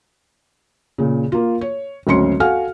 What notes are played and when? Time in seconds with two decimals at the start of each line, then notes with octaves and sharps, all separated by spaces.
0.98 A#2 C#3
1.32 A#3 F4
1.61 C#5
2.07 G#1 D2 F#3 C#4 C6 C#7
2.40 F#4 A4 F5 F#5 G#5 F6